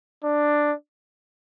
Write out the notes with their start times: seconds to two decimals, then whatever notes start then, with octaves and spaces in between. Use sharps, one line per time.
0.24 D4